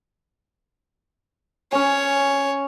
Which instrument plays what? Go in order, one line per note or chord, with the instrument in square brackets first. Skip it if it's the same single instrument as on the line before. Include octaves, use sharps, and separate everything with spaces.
[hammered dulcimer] C#4 G#5 [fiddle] C#5